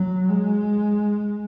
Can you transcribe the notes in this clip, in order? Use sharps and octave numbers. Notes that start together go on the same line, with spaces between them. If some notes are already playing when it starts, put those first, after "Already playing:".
Already playing: F#3
G#3